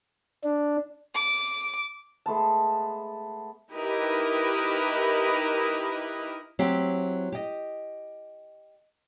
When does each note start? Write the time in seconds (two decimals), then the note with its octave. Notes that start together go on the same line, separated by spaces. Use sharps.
0.44 D4
1.14 D6
2.26 G#3 A3 B3 A5
3.73 D#4 E4 G4 A#4 B4 D#5
6.59 F#3 C4 E4 G4
7.32 G4 D#5